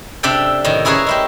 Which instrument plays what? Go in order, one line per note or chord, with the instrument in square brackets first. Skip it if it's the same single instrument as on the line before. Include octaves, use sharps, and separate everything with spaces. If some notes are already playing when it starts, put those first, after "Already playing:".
[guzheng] C3 D4 A4 D5 E5 G5
A2 D#3
C#4 E4 G#4 A#4 B4 C#5
G#3 E4 G4